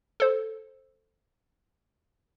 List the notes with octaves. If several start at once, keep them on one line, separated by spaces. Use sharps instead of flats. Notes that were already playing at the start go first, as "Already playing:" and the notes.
A4 C5